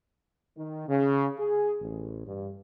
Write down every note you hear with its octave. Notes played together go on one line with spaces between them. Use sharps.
D#3
C#3
G#4
A1
G2